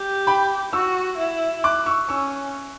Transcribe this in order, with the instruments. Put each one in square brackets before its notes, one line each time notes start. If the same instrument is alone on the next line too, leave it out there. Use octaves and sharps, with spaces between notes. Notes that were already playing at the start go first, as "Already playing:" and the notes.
Already playing: [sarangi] G4
[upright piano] G5 B5
[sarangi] F#4 [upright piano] C#6 E6
[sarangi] E4
[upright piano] D6 F#6
C#6 E6
[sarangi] C#4 [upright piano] C#6 E6